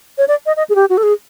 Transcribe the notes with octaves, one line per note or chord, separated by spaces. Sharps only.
C#5
D5
D#5
D#5
G#4
G4
F#4
A4
G#4